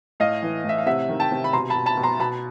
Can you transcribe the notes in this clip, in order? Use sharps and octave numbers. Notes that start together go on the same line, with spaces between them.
A2 D#5 F5
E3
A2
E5
F5
C3 E5 F#5
D#3
G5 A5
C3
B5
B2 A#5 C6
A5 B5
B2
A5 B5
B2
A#5 C6
B2 A5 B5